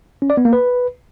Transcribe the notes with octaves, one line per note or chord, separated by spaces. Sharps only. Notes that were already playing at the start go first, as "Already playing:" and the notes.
C#4
D5
B3
A#3
B4